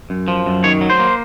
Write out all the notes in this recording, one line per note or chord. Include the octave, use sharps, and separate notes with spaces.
F#2
F3
F#2
D#3 C#5
F#3
C5
A#3